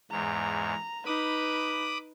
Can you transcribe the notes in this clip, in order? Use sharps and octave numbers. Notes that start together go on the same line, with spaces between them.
E2 G#2 A#5
D#4 B4 B5 D6 D#6